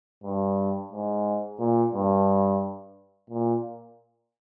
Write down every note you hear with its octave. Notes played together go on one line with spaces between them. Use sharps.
G2
G#2
A#2
G2
A#2